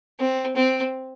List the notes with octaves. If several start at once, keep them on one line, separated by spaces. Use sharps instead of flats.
C4
C4